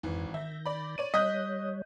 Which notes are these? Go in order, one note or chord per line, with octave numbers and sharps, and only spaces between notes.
G#1 F2 E3
D#3 E5 G6 A#6
D5 B5
C#5 D5 D#7
G3 C#5 D#5 F#6 G6 B6